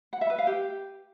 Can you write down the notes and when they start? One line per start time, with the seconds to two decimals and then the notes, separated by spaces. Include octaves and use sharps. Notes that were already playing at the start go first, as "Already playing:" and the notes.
0.13 F#5
0.21 E5
0.30 B4
0.38 F5
0.47 G4